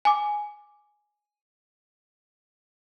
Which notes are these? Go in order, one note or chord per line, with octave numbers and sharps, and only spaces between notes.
G#5 D6